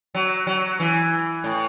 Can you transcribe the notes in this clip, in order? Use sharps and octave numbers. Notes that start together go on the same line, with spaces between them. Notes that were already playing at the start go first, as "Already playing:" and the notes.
F#3
F#3
E3
A2